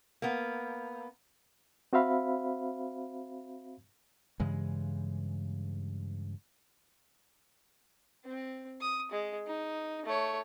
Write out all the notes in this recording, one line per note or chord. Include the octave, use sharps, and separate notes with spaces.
A#3 B3
C4 F#4 C5 E5 F5 B5
G2 C#3 E3 G#3
C4
D#6
G#3
D#4
A3 C#5